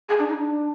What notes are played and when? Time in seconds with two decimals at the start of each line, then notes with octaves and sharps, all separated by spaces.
0.09 G#4
0.19 D4
0.28 D#4
0.38 D4